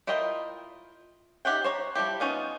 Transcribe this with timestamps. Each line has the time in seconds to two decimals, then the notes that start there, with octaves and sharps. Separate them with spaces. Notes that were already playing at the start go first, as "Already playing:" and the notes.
0.07 E4 F4 A#4 D#5 G5
1.45 D#4 G4 E5 F#5 G5
1.64 C5 C#5 A#5
1.95 F3 G3 E4 G4
2.20 B3 C#4 D#4 F4